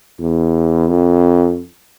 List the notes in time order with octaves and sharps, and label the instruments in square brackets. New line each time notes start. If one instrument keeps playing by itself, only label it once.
[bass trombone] E2
F2